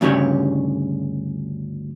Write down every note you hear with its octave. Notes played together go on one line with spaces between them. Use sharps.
D2 G2 C#3 G4 C#5